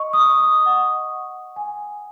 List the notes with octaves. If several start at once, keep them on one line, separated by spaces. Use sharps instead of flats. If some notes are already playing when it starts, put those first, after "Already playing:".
Already playing: D#5 C#6
D#6
C#6
F#5
G#5